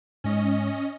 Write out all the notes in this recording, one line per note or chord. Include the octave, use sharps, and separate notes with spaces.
G#2 C#4 D#5